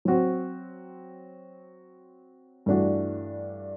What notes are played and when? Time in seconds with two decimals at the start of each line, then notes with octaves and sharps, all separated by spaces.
0.05 F#3 C4 F#4 C5
2.66 G2 E3 A3 D4 F#4